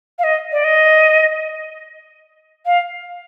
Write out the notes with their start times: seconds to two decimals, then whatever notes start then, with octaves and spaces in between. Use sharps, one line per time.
0.19 F5
0.24 D#5
0.52 D5
0.64 D#5
2.66 F5